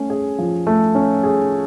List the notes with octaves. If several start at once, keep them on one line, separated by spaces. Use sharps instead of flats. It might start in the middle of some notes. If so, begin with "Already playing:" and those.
Already playing: A3 C#4
G#4
F3
A3
C#4
G#4